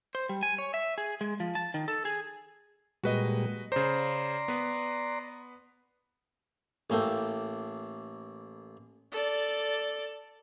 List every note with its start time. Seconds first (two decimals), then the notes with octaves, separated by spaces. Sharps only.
0.15 C5
0.29 G3
0.43 G#5
0.58 C#5
0.74 E5
0.98 G#4
1.21 G#3
1.40 F3
1.55 A5
1.74 D#3
1.88 A4
2.05 G#4
3.04 A#2 G3 G#3 F#4 B4 D#5
3.72 C#3 C5 D5 A#5 C6
4.48 B3 B4
6.90 A1 A#3 A4 G5
9.12 A4 D5